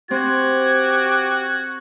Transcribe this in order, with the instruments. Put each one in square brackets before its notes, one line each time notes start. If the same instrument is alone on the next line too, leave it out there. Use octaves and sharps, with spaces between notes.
[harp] C4 [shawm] F#4 [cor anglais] G4 [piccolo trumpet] G#6